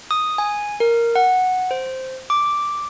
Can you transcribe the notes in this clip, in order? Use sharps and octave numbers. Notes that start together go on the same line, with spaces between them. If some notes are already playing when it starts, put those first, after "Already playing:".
D#6
G#5
A#4
F#5
C5
D6